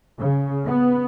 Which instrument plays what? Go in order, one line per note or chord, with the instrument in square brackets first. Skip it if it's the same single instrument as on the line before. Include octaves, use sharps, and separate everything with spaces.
[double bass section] C#3
B3